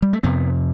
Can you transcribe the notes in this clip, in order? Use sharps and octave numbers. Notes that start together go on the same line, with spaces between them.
G3
A3
F2 C3 B3